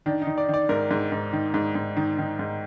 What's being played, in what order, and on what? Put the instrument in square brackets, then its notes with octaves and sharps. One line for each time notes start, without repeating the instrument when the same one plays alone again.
[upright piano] D#3 D4
D#4
D#3
D5
D#3
D5
G#2 A#4
G#2
G#2
D#3
G#2
G#2
D#3
D#3
G#2